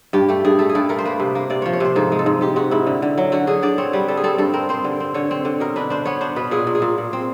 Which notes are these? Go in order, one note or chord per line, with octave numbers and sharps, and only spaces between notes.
G2 G4
A3 G4
G2 G#4
A3 A4
G#4
G2 A4
A3 A#4
C5
A#3 B4
C3
A#3
C3 D5
F3 C#5
C#5
C3 C5
G#2 A4
G#3
A4
G#2
G#2 G4
G#2 F#4
G#2 E4
D3
D3
F#3
D3 F#4
D3 G#4
D3 D5
C4 C#5
G3 B4
G3 A4
G#4
C4 A4
G2 A4
C4 A#4
C4 C5
D3
C4
D3 C#5
C4
D3
B2 A#4
D4 B4
D4 C5
B3 C#5
D4 C5
B2 B4
A#2 G#4
A#2
G#4
A#2
A#2
C4